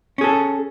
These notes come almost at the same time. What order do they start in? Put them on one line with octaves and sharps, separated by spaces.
C#4 G#4 A4